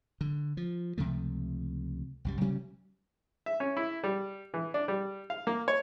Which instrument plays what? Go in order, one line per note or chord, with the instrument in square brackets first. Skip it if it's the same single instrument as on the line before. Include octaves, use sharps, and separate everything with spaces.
[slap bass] D3
F3
C#2 C3 F3 A3
C2 F#2 G3
C3 F#3 G3 C#4
[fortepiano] E5
C#4
E4
G3
E3
D4
G3
F5
A#3
C#5